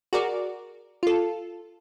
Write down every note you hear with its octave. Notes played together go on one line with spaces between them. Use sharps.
F#4 G#4 A#4 D5
F4 A4